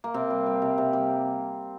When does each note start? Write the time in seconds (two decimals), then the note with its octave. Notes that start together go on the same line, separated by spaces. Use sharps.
0.04 A#3
0.14 C3 C4
0.30 G3
0.46 G3
0.62 C3
0.78 C3
0.93 G3